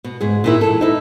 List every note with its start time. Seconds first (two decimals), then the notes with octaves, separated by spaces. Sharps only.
0.04 B2
0.21 D2 G#2 G#4
0.44 A#2 D#3 E4
0.61 E3 A4
0.81 D#4 E4